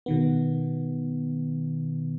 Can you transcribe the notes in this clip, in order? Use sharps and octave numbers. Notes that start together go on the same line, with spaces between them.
B2 D#3 B3